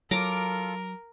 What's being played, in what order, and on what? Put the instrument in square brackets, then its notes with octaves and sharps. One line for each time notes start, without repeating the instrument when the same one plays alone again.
[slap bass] F#3 [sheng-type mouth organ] F4 A4 [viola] A#4 [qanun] A#5 D6